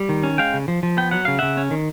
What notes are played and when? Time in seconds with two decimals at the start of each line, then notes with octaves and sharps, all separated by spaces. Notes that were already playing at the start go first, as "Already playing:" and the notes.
Already playing: G3
0.09 D#3
0.23 C#4
0.38 G#3 F5 G5
0.54 C#3
0.68 F3
0.83 F3
0.97 B3 G5
1.11 F#3 F#5
1.25 C#3 F5
1.39 C#3 E5 F#5
1.57 C#4
1.71 D#3